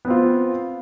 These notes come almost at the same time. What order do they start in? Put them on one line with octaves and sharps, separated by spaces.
B3 C4 F4